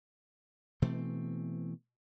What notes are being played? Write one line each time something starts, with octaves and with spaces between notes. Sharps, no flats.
B2 E3 A3 C4